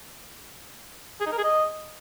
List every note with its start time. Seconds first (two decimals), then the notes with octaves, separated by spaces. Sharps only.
1.21 G#4
1.26 D#4
1.32 A#4
1.38 G#4
1.44 D#5